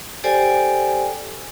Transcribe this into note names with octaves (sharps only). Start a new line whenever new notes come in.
G4 A4 C5 D5 G5 G#5